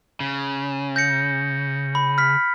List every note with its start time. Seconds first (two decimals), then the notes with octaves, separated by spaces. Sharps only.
0.20 C#3
0.96 G6 A#6 C#7
1.95 B5
2.18 F6 B6